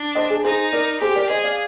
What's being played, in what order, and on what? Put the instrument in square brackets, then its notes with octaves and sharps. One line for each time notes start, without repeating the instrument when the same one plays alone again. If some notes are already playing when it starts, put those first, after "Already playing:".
Already playing: [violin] D4
[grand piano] C5 D#5
G#4
[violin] D#4 [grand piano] G#4 C5
[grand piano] A#4 D5
[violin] G4 [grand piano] G#4 C5
[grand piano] A#4 D5
[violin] G#4 [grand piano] C5 D#5
[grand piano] D5 F5